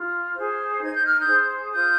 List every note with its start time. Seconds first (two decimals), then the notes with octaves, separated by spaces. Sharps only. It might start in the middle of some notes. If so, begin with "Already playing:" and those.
Already playing: F4
0.37 G#4 C5
0.82 D#4 G#6
0.94 G6
1.07 F6
1.19 D#6 G6
1.27 G#4 C5
1.71 F4 D#6 G6